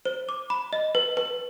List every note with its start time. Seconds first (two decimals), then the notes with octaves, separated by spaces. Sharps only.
0.05 C5
0.29 D6
0.50 B5
0.73 D#5
0.95 B4
1.17 B4